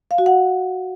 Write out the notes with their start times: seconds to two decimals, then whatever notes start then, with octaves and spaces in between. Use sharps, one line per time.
0.11 F5
0.18 F#4
0.26 F#5